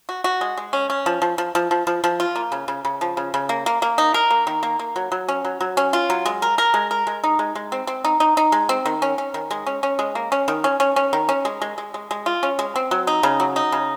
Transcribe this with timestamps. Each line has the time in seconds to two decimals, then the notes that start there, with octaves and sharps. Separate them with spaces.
0.09 F#4
0.24 F#4
0.41 G#3
0.57 G#3
0.73 C#4
0.90 C#4
1.06 F3
1.22 F3
1.38 F3
1.55 F3
1.71 F3
1.87 F3
2.04 F3
2.20 F4
2.36 A#3
2.52 C#3
2.68 C#3
2.85 C#3
3.01 F3
3.17 C#3
3.34 C#3
3.49 A#3
3.66 A#3
3.82 A#3
3.98 D#4
4.14 A#4
4.30 A#3
4.47 D#3
4.63 A#3
4.79 A#3
4.96 F#3
5.12 F#3
5.28 C#4
5.45 F#3
5.61 F#3
5.77 C#4
5.93 F4
6.10 F#3
6.26 G#3
6.42 A#4
6.58 A#4
6.74 G#3
6.91 A#4
7.07 G#3
7.24 D#4
7.39 G#3
7.55 G#3
7.72 C4
7.87 C4
8.04 D#4
8.20 D#4
8.37 D#4
8.52 G#3
8.69 C4
8.86 D#3
9.02 C#4
9.18 C#4
9.34 D#3
9.51 G#3
9.66 C#4
9.83 C#4
9.99 G#3
10.15 A#3
10.32 C#4
10.48 D#3
10.64 C#4
10.80 C#4
10.96 C#4
11.13 D#3
11.29 C#4
11.45 G#3
11.62 G#3
11.78 G#3
11.94 G#3
12.11 G#3
12.26 F4
12.43 C#4
12.59 G#3
12.76 C4
12.91 F#3
13.07 D#4
13.23 C#3
13.40 F#3
13.56 D#4
13.72 C#3